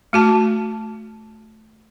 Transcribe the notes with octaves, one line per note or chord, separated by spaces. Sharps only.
A3 F#4 A5